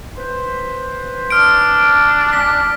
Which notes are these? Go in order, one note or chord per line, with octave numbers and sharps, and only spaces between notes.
B4 C5
D4 D#6 F6 D7
G#3 C#4 D5 B6